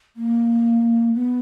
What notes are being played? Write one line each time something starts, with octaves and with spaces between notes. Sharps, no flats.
A#3
B3